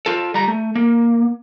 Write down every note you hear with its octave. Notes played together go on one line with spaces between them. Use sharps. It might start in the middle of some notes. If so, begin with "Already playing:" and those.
F4 A4
G3 A#5
A3
A#3